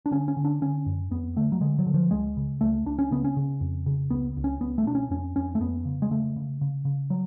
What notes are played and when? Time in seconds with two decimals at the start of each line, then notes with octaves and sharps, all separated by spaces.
0.06 D4
0.11 D3 C#4
0.28 C#4
0.37 D3
0.44 D4
0.62 D3 C#4
0.86 F#2
1.11 F2 B3
1.36 D3 A3
1.52 F#3
1.61 D3 G#3
1.79 F#3
1.86 D3
1.94 F3
2.11 C#2 G#3
2.37 C#3
2.61 C#2 A3
2.86 C#2 D4
2.99 C#4
3.11 C#3 B3
3.24 C#4
3.36 C#3
3.61 F2
3.86 C#3
4.11 C#2 B3
4.37 C#2
4.44 C#4
4.61 C#2 B3
4.78 A3
4.86 B2 D4
4.95 C#4
5.10 F2 C#4
5.36 F2 C#4
5.55 A3
5.60 F2 B3
5.85 C#3
6.02 G#3
6.11 C#3 A3
6.36 C#3
6.61 C#3
6.85 C#3
7.10 F#3